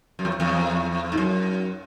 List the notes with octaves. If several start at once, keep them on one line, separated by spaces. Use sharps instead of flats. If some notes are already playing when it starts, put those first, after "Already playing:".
F#2
E2
E2
G#2
F#2